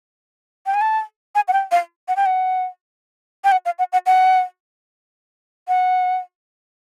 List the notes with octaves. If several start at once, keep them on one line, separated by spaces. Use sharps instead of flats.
G5
G#5
A5
G#5
F#5
G5
F5
F#5
G5
F#5
G5
F#5
F5
F#5
F#5
F#5
F#5